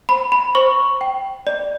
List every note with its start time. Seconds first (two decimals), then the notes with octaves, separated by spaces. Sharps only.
0.09 C5 B5
0.32 B5
0.55 C5 C#6
1.01 G5
1.47 D5